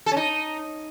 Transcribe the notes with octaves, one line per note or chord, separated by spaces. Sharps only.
A4
C#4
D#4